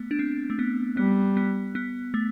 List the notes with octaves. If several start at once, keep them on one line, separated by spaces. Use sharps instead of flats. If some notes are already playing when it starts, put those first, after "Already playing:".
Already playing: A3 B3
D4
C4
A3
B3
G3 B3
B3
B3
A3